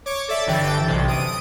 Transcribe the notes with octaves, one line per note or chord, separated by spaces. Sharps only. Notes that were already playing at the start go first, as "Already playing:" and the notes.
C#5 D6
A4 D5 E5
G1 D3 E3 G5 A6
B1 C3
D#6 D7 D#7